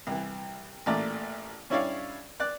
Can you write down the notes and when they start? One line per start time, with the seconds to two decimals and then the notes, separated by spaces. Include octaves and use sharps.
0.07 C2 E3
0.86 A1 A#2 A3 D5 A#5
1.70 G2 C#4 E4 C#5 D5 F5
2.40 D5 F#6